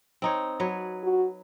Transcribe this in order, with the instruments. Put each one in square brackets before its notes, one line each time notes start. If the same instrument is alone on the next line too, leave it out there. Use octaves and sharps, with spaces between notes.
[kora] C4 D#4 C#5
F#3 B4 C#5
[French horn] F#4